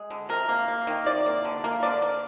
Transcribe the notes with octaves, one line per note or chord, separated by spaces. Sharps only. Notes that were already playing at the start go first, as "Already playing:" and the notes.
Already playing: G#3
D3
C3 A#4
A#3
A#3
D#3
C3 D5
A#3
D3
A#3
D3 D5
A#3